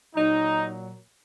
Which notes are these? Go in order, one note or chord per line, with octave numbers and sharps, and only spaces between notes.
A#2 F#3 D#4